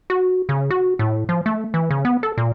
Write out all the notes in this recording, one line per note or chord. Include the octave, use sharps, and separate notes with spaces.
F#4
C#3
F#4
A2
F3
A3
E3
C#3
B3
A4
A#2